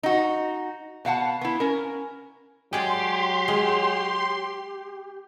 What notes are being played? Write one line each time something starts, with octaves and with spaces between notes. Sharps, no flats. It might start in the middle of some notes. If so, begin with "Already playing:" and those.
D#4 F#4
B2 F5 F#5 A5
B3 E4
C#4 A#4
F#3 G#3 G4 G#4 D5 C6
G#3